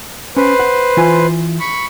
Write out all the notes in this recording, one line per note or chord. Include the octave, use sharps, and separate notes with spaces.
C#4 B4 C5
F#5
E3 F4 G#5
B5 C#6